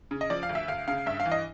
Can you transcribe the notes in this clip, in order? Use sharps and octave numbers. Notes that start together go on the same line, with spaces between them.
C#3
D#5
F3 D5
F5
D2
E5
D2 F5
C#3 F5
G2 E5
F5
E3
D#5